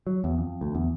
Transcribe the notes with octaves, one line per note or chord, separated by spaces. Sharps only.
F#3
E2
F2
D2
E2